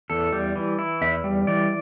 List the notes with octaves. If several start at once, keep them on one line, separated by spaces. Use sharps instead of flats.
E2 A4
G3
E3
E4
E2 E5
G3
E3 D5